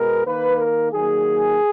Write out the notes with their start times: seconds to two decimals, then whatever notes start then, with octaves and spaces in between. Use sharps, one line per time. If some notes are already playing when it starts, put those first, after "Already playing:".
Already playing: B2 G#3 B3 A#4
0.26 D#3 A#3 B4
0.59 A#4
0.92 D#3 F#3 A#3 G#4